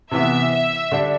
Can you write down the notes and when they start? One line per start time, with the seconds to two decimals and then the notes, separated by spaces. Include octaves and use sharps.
0.11 C3 E3 B3 E5
0.52 E5
0.92 D3 G3 D4